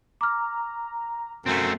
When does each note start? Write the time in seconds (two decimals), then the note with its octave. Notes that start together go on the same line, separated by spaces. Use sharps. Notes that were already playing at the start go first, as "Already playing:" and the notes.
0.21 A#5 D6 F6
1.46 F#2 A3 C4